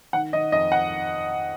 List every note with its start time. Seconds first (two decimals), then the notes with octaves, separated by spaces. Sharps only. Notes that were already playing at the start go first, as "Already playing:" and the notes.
0.13 D#3 F#5
0.33 D#3 D#5
0.52 F2 D#5
0.72 F#5